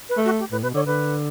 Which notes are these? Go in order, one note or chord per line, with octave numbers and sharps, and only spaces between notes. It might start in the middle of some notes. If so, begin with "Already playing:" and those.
B4
A3
F#4
G4
A2 B4
B2 B4
D3 C#5
D3 B4